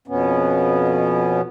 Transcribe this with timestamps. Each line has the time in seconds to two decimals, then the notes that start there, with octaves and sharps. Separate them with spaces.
0.08 F2 B2 B3 C#4